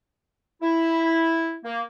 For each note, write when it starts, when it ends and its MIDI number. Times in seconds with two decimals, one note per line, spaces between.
0.62 1.56 64
1.65 1.81 58